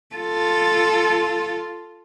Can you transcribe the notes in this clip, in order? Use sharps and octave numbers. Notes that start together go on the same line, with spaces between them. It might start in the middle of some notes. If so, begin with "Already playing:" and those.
F4 A4